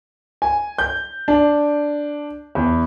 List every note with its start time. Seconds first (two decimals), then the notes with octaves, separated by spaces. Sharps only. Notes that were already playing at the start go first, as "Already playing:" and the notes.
0.42 G#5
0.78 G6
1.28 D4
2.55 E2